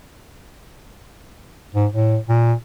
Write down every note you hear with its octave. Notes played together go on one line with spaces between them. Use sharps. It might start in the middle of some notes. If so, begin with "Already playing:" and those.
G#2
A2
A#2